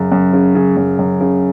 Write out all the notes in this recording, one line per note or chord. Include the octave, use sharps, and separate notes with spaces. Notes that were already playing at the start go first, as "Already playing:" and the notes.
Already playing: F#2 C#3
F#2
C#3
C#3
F#2
F#2
C#3